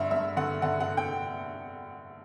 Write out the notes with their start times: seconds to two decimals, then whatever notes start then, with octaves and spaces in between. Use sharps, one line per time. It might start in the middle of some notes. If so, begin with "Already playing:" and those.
Already playing: G2 D3 D4 E5 F#5
0.11 G2 E5
0.37 D3 F#5
0.62 D3 F#5
0.80 F#5
0.88 D3
0.97 G5